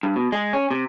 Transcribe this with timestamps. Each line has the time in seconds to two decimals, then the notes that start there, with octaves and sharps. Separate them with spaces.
0.03 G2
0.16 B2
0.32 G#3
0.53 C#4
0.71 C3